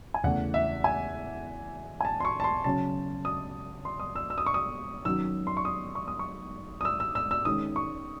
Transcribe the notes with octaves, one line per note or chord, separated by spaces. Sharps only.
G#5
E2 C#3 E3 A3 F#5
E5
G#5
G#5
A5
C6
C#6
A5
C6
C#3 F#3 C#4 A5
D#6
C6
D#6
E6
E6
D#6
C#6
D#6
D#3 F#3 C#4 E6
C6
C#6
D#6
C#6
D#6
C#6
D#6
E6
E6
E6
E6
D#3 G#3 C#4 D#6
C#6